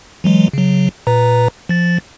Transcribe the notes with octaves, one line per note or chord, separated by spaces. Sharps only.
E3 F#3 G#3
C#3 F#3
A#2 B4 A#5
F3 A6